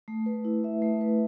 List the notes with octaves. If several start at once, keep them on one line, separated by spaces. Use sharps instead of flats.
A3
B4
E4
E5
A3
B4